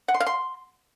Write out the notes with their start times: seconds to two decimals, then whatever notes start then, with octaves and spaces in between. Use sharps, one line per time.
0.08 F#5
0.14 C6
0.20 F5
0.26 C6